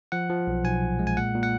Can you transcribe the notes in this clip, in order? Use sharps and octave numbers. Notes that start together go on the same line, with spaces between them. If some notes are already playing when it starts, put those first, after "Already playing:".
F3 F#5
F3
B1
B1 G#5
A#2
G#3
G#5
A#2 F#5
A#2
F#5